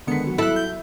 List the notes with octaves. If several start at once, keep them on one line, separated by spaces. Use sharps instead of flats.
D3 D#3 G#3 B3 B6 C#7
F#3
E4 A4 F#6
G6